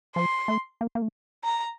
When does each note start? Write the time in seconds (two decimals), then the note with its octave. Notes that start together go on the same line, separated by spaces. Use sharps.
0.16 F3 C6
0.48 A3
0.81 A#3
0.95 A#3
1.02 A3
1.44 A#5